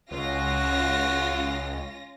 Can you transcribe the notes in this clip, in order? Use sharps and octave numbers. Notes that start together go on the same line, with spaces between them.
C#2 C#4 F4 F#4 A#6